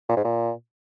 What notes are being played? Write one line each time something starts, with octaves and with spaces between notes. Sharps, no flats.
A#2
G#2
A#2